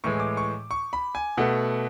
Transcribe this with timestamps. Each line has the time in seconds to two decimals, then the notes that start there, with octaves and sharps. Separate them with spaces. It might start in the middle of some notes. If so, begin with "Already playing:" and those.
0.04 A2 E3 G#3 C#6
0.20 D6
0.37 C#6
0.71 C#6
0.93 B5
1.15 G#5
1.37 B2 A3 F#5